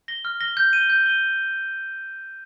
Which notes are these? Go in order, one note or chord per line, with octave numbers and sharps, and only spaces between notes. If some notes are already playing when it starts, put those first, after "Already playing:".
A#6 G7
F6
A#6 G7
G6
D#7 G7
G6
D#7 G7